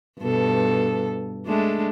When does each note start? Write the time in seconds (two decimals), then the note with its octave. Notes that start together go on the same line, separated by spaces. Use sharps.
0.20 G2 B2 A4
1.46 G#3 A3 D4